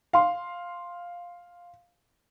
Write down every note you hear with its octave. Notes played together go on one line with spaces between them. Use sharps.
F5 C6